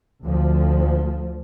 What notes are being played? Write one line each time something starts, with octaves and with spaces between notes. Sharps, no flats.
D2 F3